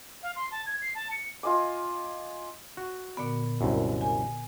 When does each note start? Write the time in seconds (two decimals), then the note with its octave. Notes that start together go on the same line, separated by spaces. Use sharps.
0.23 F5
0.36 C6
0.52 A5
0.66 G#6
0.82 C7
0.95 A5
1.11 C#7
1.43 F4 D#5 G#5 D6
2.77 F#4
3.17 A#2 D3 B3
3.61 C2 F#2
4.01 G#5